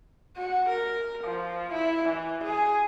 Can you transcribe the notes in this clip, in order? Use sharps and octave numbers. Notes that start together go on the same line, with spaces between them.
F#4
A#4
F3
E4
E3
G#4